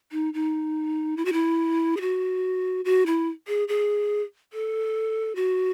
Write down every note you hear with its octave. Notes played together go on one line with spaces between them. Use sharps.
D#4
D#4
E4
F#4
E4
G#4
F#4
F#4
E4
G#4
G#4
A4
F#4